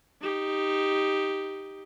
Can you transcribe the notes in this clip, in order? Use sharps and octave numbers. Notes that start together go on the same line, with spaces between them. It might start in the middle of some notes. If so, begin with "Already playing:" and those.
D#4 G4